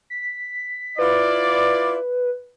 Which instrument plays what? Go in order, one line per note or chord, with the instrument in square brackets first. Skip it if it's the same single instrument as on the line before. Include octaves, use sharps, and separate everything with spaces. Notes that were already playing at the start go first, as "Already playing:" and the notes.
[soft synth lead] B6
[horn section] E4 F4 D5 [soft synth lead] B4